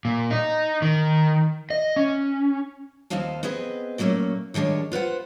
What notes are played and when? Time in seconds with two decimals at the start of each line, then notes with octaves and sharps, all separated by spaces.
0.05 A#2
0.31 D#4
0.82 D#3
1.70 D#5
1.96 C#4
3.10 D#2 F3 C4 D#4 F5 A5
3.43 B3 C4 G#4 B4 D#5
3.98 A#2 F#3 A3 A#3 C#4
4.54 D#3 F3 G#3 D4 C#5
4.92 F4 B4 C5 F#5